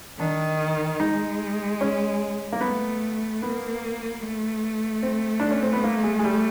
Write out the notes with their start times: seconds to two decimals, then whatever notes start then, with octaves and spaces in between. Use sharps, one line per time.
0.19 D#3 D4
0.99 G#3 D#4
1.81 C#4
2.53 A#3
2.61 A3 B3
3.41 A#3 B3
4.23 A3
5.03 C4
5.40 D4
5.51 C#4
5.62 C4
5.73 B3
5.84 A#3
6.04 G#3
6.19 G#3
6.24 G3